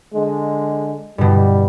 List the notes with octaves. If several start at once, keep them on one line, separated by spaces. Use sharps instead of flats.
D3 G#3
G2 B2 G3